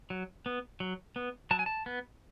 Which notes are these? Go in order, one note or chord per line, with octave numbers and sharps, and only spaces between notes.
F#3
B3
F#3
B3
F#3 A5
G#5
A5
B3